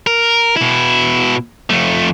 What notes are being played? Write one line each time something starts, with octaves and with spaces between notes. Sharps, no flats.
A#4
B2 E4
F2 A3